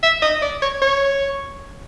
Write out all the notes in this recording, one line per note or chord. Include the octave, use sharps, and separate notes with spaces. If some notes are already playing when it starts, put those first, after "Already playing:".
E5
D#5
D5
C#5
C#5